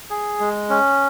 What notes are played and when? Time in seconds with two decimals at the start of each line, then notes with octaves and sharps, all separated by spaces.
0.10 G#4
0.40 G#3
0.69 C#4